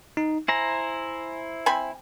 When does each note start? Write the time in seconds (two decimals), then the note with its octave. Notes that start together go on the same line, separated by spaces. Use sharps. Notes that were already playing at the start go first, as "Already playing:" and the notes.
0.17 D#4
0.48 E4 C5 G#5 A#5
1.66 C4 G#5 B5